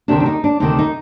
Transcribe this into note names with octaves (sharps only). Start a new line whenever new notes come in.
D2 C3 D#3 D4
D4
D#4
D4
D2 C3 D#3 D#4
D#4